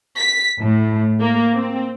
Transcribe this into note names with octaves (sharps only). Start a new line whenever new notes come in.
B6
A2
A#3
C4